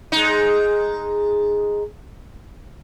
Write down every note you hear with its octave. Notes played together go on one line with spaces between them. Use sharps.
G#3 D#4